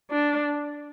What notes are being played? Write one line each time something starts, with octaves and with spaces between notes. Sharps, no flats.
D4